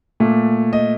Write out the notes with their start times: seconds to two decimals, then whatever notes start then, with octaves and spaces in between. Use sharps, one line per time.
0.20 A#2 A3
0.73 D#5